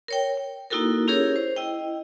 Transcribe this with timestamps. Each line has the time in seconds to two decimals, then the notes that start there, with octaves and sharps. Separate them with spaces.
0.08 A#4 C#5 G5
0.37 G5
0.70 A#3 D#4 E4 F#4 A4 A#4
1.08 C#4 E4 G4 G#4 A#4 C#5
1.36 C5
1.57 E4 D#5 G5